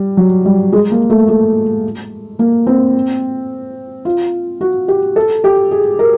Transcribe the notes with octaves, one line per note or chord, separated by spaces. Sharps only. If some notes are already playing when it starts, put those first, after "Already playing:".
Already playing: G3
F#3
G3
G#3
A#3
A3
A3
A#3
C4
F4
F#4
G4
A4
G4
G#4
A#4